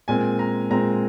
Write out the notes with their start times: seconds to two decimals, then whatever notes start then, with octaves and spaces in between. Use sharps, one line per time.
0.08 A#2 G#3 C4 G#5
0.39 A#5
0.70 A#2 G#3 C4 A#5